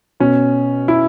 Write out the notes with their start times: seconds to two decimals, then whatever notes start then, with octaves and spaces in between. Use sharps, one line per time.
0.20 B2 C#4
0.88 E4